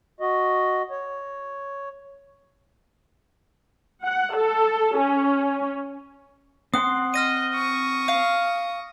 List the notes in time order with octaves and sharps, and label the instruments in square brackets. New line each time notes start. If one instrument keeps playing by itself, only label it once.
[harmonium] F#4 D#5
C#5
[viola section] F#5
A4
C#4
[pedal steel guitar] C4 F#5 C6 [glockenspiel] D#6
[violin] D#5 [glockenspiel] F6 A#6 D#7
[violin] C#6 D#6
[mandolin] F5